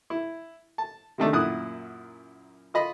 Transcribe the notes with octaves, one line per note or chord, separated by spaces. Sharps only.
E4
A5
C3 D#3 A3 D4
F#2 A#2 E4 D#6 F#6
F4 D#5 B5